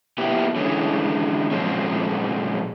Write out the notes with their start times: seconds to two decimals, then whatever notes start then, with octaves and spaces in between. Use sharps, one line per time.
0.18 A#3 B3 E4 G4
0.56 D3 E3 G#3 C#4
1.51 A#2 F3 G#3 A#3 C4 C#4